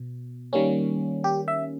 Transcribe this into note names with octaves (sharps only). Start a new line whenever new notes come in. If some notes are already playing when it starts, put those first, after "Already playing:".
Already playing: B2
D#3 G3 A#3 C#4
G4
E5